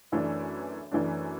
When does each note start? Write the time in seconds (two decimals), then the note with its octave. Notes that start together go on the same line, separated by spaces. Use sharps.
0.12 F#2 E3 A3 D4
0.92 F#2 E3 A3 D4